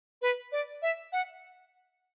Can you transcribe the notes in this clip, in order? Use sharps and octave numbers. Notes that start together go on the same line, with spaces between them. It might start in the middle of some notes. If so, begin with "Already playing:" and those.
B4
D5
E5
F#5